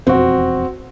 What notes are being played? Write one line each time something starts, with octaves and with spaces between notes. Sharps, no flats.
E1 F2 B2 C4 F#4